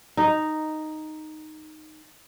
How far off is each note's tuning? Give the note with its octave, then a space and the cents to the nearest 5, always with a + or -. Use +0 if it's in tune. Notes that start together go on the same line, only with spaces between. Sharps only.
D#4 -5